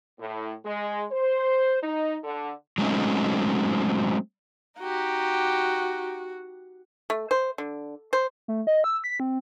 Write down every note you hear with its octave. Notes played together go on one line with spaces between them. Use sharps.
A2
G#3
C5
D#4
D3
F#3 G#3 A3 C4 C#4 D#4
D#4 F#4 G4
A3
C5
D3
C5
A3
D#5
E6
B6
C4